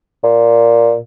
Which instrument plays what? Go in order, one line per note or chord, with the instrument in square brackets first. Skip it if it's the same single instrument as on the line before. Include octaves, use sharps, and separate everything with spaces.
[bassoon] A#2